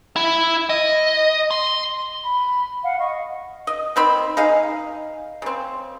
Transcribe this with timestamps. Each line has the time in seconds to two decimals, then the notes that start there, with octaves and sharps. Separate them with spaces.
0.16 E4
0.69 D#5
1.51 C6
2.24 B5
2.83 F5 F#5
3.00 D#5 C#6
3.67 D#5
3.96 D#3 C4 B5
4.37 D#4 G#4 F5
5.42 C#3 C4